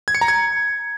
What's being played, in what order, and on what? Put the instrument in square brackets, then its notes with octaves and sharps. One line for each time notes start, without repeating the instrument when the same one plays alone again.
[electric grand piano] G#6
C#7
A#5
G#6